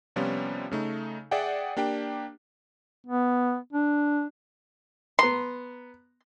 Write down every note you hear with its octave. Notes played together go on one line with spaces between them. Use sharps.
C3 F3 G3 B3 C#4 F4
C#3 A3 D#4
G#4 D5 E5 F#5 G5
A#3 D4 G4 G5
B3
D4
B3 A#5 C6